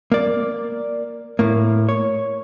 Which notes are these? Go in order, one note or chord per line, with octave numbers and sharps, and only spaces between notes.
A#3 D5
A2 A#3
C#5